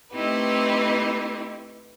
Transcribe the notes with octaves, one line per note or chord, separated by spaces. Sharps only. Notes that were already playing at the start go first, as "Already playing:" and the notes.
A3 C4 D#4 E4 G4 B4